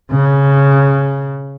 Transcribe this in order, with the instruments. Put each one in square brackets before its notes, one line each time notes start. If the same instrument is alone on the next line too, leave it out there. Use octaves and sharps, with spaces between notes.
[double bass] C#3